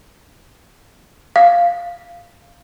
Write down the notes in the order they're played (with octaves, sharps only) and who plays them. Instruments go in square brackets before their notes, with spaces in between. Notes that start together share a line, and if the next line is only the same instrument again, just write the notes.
[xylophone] F5